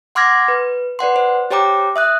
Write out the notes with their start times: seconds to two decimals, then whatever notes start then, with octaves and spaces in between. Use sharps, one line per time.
0.15 F#5 C6 D6 F6 G#6 A#6
0.48 B4
0.99 B4 D5 F#5 C6
1.16 C5
1.51 G4 C5 C#5 G5 A#5 D6
1.96 E5 D#6 F#6